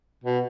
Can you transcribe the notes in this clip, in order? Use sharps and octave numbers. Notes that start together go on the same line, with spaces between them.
B2